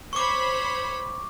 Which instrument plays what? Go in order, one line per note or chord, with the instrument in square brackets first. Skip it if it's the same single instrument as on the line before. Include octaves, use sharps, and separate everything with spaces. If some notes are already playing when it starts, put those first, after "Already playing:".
[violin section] C5 C#5 B5 [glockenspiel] C#6 D6